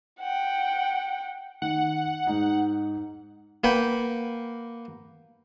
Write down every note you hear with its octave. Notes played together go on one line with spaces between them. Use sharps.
F#5 G5
D#3 F#5
G#2 D#4
A#3 B4 F#5 G5